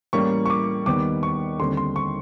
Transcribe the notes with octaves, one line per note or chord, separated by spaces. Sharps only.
A2 E3 G3 A#3 C#4 C#6
C#6
D6
D#2 D#3 G3 B3 D6
C#6
D#2 D3 G3 C4 C6
C6
C#6